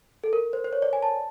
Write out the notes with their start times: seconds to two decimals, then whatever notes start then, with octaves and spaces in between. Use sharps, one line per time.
0.24 A4
0.33 A#4
0.53 C5
0.64 C5
0.73 C#5
0.82 D5
0.93 G#5
1.02 A5